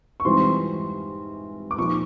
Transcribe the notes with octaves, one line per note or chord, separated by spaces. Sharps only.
C#6
G#2 E3 G3 C4 F4 C6
D6
A#2 F3 A#3 D#4 C#6